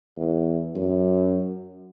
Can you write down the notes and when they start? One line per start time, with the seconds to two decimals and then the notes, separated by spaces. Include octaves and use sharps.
0.17 E2
0.76 F#2